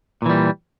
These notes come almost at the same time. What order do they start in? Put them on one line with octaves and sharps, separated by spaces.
A#2 E3 G3